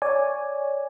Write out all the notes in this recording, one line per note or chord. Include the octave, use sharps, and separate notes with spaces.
C#5 D5 G#5